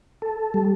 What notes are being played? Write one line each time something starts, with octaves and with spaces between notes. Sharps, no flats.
A4
G3